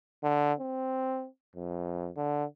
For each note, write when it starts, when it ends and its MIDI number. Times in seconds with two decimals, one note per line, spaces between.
0.23 0.53 50
0.60 1.27 60
1.56 2.10 41
2.17 2.45 50